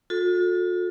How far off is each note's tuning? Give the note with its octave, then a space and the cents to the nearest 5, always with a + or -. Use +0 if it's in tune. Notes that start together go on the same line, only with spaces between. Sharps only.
F4 +45 A4 +0